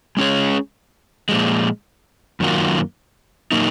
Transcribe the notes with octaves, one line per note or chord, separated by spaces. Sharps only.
G#3 C#4 G#4 C#5
A#2 F3 G#3
F#2 D#3 F#3 A#3 F4
A#2 F#3 A#3 D#4